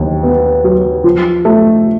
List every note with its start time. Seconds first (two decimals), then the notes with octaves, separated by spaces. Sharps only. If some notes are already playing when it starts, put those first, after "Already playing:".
Already playing: D#2
0.23 B3
0.64 F#3
1.04 F3
1.45 A3